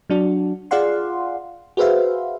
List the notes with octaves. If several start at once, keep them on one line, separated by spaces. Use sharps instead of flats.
F#3 D4 F#4
F4 G#4 D5 F5 F#5 C6
F#4 G#4 B4 C5 E5 F5